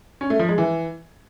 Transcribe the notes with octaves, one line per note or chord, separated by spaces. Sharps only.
C#4
A3
F3
G#3
E3